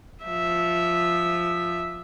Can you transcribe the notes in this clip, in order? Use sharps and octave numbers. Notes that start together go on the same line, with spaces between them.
F3 E5